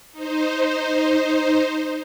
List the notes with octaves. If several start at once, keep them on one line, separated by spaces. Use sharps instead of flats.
D#4 C5